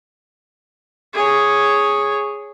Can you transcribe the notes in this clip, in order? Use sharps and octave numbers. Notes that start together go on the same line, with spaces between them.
G#4 C#5